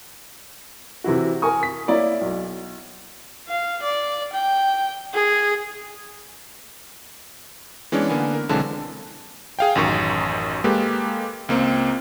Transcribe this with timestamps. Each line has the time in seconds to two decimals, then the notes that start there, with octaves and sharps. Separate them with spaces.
1.04 C3 E3 E4 F#4
1.42 A#4 G#5 C#6 D#6
1.63 B6
1.88 A#3 E4 C#5 D5
2.21 B1
3.49 F5
3.83 D5
4.33 G5
5.14 G#4
7.92 E3 G#3 B3 C#4 D4
8.09 D3 A#3 B3 G#5
8.33 A#4
8.49 B1 D3 E3 G#3 C4 A5
9.59 G#4 F5 G5
9.75 A1 F#2 D#3 C#6
10.64 G#3 A#3 G4 A4 B4
11.49 C#2 A#3 C4